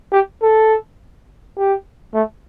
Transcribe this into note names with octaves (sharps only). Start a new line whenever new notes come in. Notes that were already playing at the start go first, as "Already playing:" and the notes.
G4
A4
G4
A3